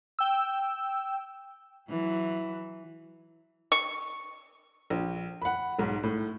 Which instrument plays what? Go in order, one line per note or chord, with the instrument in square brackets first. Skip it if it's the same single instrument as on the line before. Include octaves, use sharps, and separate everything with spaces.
[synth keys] G5 E6
[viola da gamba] E3 F#3
[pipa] C#6
[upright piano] A#1
F#5 B5
B1 G#2
A2